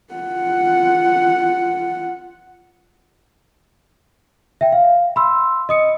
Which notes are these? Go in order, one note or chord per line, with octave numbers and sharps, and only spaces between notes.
F4 F#5
E5 G5
F5
B5 C6 E6
D#5 D#6 C#7